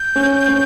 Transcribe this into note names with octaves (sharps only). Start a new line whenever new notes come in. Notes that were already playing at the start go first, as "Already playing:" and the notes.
Already playing: G6
C#4
C#4